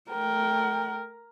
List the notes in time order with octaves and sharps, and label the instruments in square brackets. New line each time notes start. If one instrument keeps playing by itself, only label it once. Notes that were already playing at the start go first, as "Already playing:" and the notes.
[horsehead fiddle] A3 G5 [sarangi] A#4